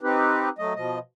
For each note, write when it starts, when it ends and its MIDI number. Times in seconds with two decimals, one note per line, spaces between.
0.01 0.49 60
0.01 0.49 63
0.01 0.49 67
0.01 0.49 71
0.58 0.73 54
0.58 0.73 57
0.58 0.73 75
0.76 0.99 47
0.76 0.99 53
0.76 0.99 75